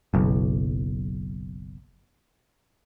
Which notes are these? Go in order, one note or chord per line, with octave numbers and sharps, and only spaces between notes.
F#1 B1